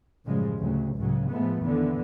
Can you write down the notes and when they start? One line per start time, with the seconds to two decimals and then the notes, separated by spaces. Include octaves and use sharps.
0.25 A1 F#2 C#3 F3 G3 G#3
0.57 D2 C#3 F#3
0.94 C#2 A2 C#3 F#3
1.30 A2 F3 G#3 A3 B3
1.62 D#2 D3 E3 B3